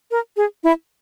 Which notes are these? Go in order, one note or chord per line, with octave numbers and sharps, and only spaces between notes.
A#4
G#4
E4